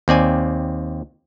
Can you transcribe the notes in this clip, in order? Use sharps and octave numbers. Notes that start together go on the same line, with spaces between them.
D#2 C4 D5 G#5